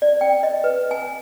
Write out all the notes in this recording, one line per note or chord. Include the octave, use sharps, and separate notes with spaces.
D5
G5
D#5
B4
G#5